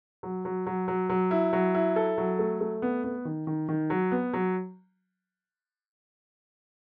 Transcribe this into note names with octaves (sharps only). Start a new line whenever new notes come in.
F#3
F#3
F#3
F#3
F#3
E4
F#3
E4
A4
F#3
A3
A3
B3
B3
D#3
D#3
D#3
F#3
B3
F#3